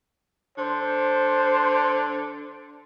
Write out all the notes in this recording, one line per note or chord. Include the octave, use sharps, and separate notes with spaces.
D3 C5